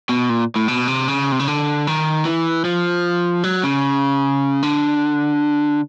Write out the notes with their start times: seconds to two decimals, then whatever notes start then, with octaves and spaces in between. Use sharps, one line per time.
0.09 B2
0.29 A#2
0.56 A2
0.68 B2
0.88 C3
1.08 C#3
1.32 C3
1.39 C#3
1.48 D3
1.87 D#3
2.25 E3
2.65 F3
3.44 F#3
3.64 C#3
4.63 D3